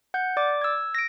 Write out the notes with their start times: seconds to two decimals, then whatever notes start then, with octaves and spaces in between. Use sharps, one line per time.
0.14 F#5 G6
0.37 D5 D6
0.62 E6 G#6
0.95 A#6 D7